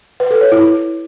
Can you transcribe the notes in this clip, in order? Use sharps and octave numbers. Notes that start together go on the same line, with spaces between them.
B4
A4
C#5
E4